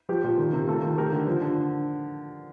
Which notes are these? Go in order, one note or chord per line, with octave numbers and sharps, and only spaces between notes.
F3 G4
A#2
D#3
C3
A3 F4 A4
D#3
A3 G4 A#4
D3
F3
D3